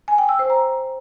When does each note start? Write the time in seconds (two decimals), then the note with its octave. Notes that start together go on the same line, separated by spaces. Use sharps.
0.08 G#5
0.18 G5
0.29 E6
0.39 C5
0.50 A#5